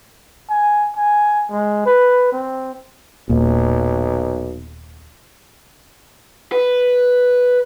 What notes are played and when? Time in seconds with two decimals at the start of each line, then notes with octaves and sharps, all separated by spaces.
0.49 G#5
0.96 G#5
1.50 G#3
1.85 B4
2.32 C4
3.29 D#1 B1 A#2
6.52 B4